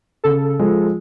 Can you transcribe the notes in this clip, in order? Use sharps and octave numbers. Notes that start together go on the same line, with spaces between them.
C#3 A4
F3 G#3